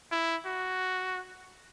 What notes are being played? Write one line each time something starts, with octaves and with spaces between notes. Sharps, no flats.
E4
F#4